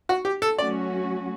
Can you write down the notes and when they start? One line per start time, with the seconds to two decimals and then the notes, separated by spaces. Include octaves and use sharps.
0.09 F#4
0.25 G4
0.42 A4
0.58 F#3 A3 C#4 F#4 D5